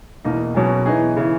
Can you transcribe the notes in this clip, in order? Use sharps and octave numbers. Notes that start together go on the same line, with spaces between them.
E2 B2 A#3 D#4
B2 F#3 C#4 G#4
E3 B3 D#4 G#4
C#3 E3